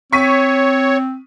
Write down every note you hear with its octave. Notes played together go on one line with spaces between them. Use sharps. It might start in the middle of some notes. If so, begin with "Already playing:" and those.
C4 C#5 C#6 B6 D#7